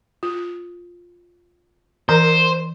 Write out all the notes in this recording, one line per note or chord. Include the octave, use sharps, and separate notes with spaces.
F4
E3 A#4 C5